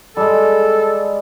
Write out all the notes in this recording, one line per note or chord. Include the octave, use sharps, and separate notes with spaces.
G3 G#3 A4